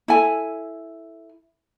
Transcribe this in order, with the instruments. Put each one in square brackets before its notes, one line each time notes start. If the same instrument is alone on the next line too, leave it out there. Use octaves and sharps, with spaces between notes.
[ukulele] E4 A4 G#5